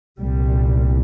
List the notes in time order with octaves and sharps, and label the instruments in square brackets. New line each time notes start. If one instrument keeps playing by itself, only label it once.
[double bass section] C2 A#2 G3